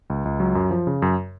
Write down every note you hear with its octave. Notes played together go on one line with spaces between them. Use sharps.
C#2
C#2
F#3
F#2
F3
C#3
F#2